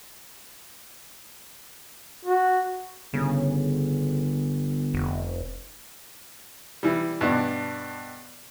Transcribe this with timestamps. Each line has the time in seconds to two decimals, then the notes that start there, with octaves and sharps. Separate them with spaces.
2.25 F#4
3.14 G1 C#3
4.94 F1
6.83 E3 G3
7.21 G2 B2 D4